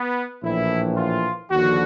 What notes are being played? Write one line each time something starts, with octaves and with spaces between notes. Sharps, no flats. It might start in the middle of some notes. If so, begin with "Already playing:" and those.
Already playing: B3
A#1 A2 E3 E4
F4
D#2 D3 F3 F#4